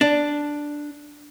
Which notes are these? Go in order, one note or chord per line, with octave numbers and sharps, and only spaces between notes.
D4